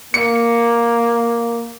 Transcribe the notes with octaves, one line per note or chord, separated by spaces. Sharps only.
A#3 C#7